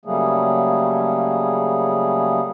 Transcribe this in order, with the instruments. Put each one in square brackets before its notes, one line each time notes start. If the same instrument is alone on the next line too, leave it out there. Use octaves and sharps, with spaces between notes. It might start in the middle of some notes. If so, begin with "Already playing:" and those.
[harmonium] C#3 F#3 G3 A3 A#3 G#4